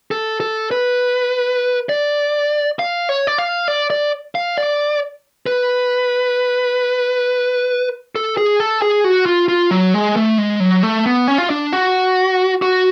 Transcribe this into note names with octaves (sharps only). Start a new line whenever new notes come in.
A4
A4
B4
D5
F5
C#5
D5
F5
D5
D5
F5
D5
B4
A4
G#4
A4
G#4
F#4
F4
F4
F#3
G#3
A3
G#3
F#3
A3
B3
C#4
F4
D4
F#4
F#4